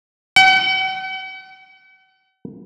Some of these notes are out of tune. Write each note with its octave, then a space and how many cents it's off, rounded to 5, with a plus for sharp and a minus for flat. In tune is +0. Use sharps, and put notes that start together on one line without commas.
F#5 +45